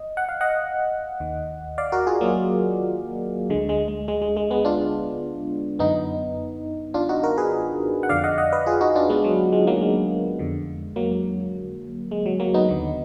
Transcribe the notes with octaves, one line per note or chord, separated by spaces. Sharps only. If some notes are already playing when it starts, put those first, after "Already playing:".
Already playing: D#5
F#5
F5
D#5 F#5
D#2 D#3
D5 F5
F#4 A#4
F4 G#4
F#3 A#3
D2 D3 G#3
G#3
G#3
G#3
G#3
G#3
G#3 B3
D4 F4
F#2 D3 B3 D#4
D4 F4
D#4 F#4
F#4 A#4
G#4 B4
F#5
F2 D3 D5 F5
D#5 F#5
D#5 F#5
B4 D#5
F4 G#4
D#4 F#4
D4 F4
G#3 B3
F#3
G#3
F#3 A#3
G#3
F2 D3
F#3 A#3
G#3
F#3
F#3 A#3
B3 D#4
D#2 D3